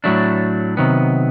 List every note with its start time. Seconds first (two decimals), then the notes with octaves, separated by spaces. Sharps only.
0.04 A2 F#3 A3 D4
0.77 C3 D#3 F#3 B3